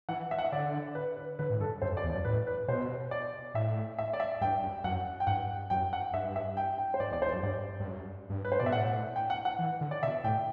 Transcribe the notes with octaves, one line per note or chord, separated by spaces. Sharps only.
E3 F#5
E5
F#5
E5
D3 D5
B4
B4
D3 B4
A2
G2 A4
F#2 C5
F#2
D5
E2
D5
F#2
A2 B4
B4
B2 C5
D5
A2 E5
E5
D5
E5
G2 G5
F#2
F#2 F#5
G5
G2 F#5
F#2 G5
F#5
G2 E5
E5
G5
G5
C5
G2 D5
E2 D5
E2 C5
F#2
G2 D5
G2
F#2
G2
B4
C5
B2 D5
E5
A2 F#5
G5
F#5
F#5
E3
D3
D5
B2 E5
A2 G5